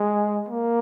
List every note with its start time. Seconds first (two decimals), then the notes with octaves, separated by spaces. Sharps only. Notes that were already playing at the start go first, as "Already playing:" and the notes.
Already playing: G#3
0.49 A#3